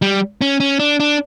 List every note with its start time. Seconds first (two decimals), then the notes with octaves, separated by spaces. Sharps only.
0.02 G3
0.41 C#4
0.60 C#4
0.79 D4
1.00 D4